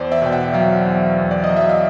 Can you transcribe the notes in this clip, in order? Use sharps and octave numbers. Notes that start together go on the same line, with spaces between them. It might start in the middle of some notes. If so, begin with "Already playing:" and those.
Already playing: E2 C5 D5
D5 E5
B2 G5
E5 F#5
F#3 F5 G5
E2
E2
D5
D#5
F#3
E5
F5